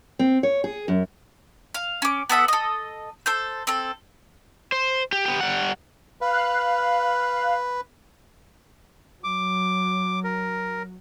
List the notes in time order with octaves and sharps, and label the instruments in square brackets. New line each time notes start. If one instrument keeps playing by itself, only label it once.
[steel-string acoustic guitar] C4
C#5
G#4
F#2
[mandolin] F5
C#4 D6
B3 A4 E5 F#5
A4 D#5
A4 C5 G6
C4 A4
[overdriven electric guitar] C5
G4
B3 G4
G3 F#5
[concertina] B4 [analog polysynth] F5 F#6
[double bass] F#3 [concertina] D6
[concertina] A#4